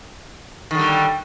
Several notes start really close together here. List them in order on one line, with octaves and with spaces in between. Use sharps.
D#3 D3 G3